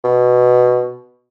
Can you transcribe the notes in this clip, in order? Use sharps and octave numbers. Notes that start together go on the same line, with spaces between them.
B2